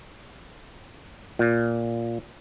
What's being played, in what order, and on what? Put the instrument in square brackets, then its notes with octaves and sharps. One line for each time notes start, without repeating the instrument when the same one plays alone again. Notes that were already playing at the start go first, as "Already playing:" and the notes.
[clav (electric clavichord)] A#2